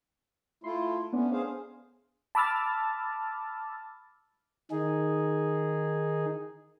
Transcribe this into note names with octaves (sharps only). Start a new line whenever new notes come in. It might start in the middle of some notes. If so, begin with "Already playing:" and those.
A3 E4 F4 C6
A3 B3 C#4 D4
G#4 C5 F5
A5 B5 D6 E6 F6 A6
D#3 D#4 G#4